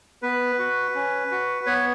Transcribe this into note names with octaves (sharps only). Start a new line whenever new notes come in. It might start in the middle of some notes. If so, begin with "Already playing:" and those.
B3 B4
F#4
C#4
F#4
B3 C#5